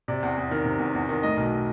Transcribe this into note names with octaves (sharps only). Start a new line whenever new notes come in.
C3 D5
E2
E2
D#3
C3
E2
E2
D#3
A2 D#5
B1